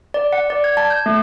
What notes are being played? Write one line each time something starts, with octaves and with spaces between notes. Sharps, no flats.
D5
F#5
D5
G#6
A5
G6
A3